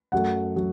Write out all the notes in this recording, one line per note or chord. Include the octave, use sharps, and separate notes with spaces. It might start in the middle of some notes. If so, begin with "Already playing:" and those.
F#2 F#3 A3 F#5
F#3